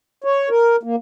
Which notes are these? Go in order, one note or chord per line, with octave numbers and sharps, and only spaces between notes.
C#5
A#4
A#3